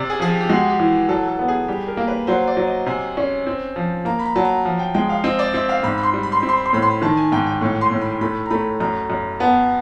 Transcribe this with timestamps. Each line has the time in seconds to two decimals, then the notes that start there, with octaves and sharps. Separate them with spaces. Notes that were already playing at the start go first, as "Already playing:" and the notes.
Already playing: C3 D5
0.10 G#4
0.20 F3 G#4
0.30 G4
0.40 G4
0.49 G#3 F#4
0.70 G4
0.79 E3
1.09 F#3 A4
1.28 A4
1.39 B3
1.48 G#4
1.68 G3 G4
1.88 A#4
1.97 A#3
2.08 B4
2.27 F#3 C5
2.47 D5
2.57 F#3
2.67 D#5
2.86 C3 G#5
3.17 C#4
3.46 C4
3.76 F3
4.05 A#3 A#5
4.19 B5
4.25 A#5
4.36 F#3 A5
4.45 A#5
4.65 F3
4.79 G5
4.94 G#3 G5
5.09 F5
5.24 C4 D#5
5.39 D5
5.54 C4 E5
5.69 F5
5.83 G#2 B5
5.98 B5
6.03 C6
6.13 G3
6.23 B5
6.32 C6
6.40 C4 B5
6.49 C6
6.57 B5
6.66 C6
6.73 A2 B5
6.82 C6
6.91 B5
7.02 D#3 A5
7.17 G#5
7.32 G#2 G5
7.47 G5
7.61 A2 C#6
7.81 C6
7.91 A2
8.01 B5
8.21 A3 B5
8.46 A#5
8.50 A3 B5
8.80 F#2 A#5
9.10 F#2
9.40 B3 A5